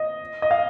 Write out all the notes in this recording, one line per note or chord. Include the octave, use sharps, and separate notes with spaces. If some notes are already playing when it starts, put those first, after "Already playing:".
Already playing: D#5
D#5
F5